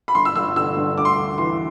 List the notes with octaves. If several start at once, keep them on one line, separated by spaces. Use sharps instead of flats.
B5
G1 C6
E6
G1 E6
D3 E6
G2
D2 D6
C6
D2 D6
E3 C6